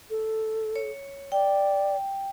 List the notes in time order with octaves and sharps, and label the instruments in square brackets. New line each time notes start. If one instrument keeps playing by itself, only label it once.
[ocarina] A4
[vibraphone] C#5
[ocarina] D5 [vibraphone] G5